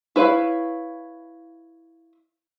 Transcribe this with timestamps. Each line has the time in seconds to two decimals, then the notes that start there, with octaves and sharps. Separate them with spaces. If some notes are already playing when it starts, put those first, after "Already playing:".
0.16 E4 B4 C#5 F5